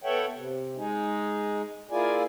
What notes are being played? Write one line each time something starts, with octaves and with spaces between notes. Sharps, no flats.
B3 A4 C#5 E5 F#5 G5
C3
G#3 D#4 G#4
A#3 E4 F4 G#4 D5 G#5